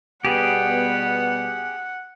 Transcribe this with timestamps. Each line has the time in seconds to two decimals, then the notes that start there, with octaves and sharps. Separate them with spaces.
0.25 B2 G3 B3 G4 G#4 F#5